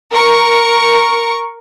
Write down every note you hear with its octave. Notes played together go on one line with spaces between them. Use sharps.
A#4 C#6